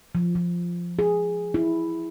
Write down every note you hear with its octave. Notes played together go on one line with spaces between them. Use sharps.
F3
F3
G#4
E4